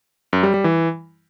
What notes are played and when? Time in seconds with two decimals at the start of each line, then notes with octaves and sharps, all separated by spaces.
0.33 F#2
0.43 G3
0.54 G3
0.64 E3